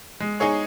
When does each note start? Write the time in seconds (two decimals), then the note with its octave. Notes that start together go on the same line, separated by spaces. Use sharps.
0.20 G#3
0.40 D#4 G#4 C#5